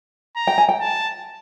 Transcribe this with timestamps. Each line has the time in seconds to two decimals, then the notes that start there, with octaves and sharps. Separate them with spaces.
0.36 A#5
0.47 G5
0.58 G#5
0.69 G5
0.80 A5